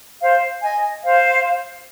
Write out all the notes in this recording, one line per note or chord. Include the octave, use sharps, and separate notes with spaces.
C5 F5
D#5 G#5
C5 F5